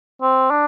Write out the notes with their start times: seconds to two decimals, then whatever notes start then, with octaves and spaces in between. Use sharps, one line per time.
0.22 C4
0.51 D4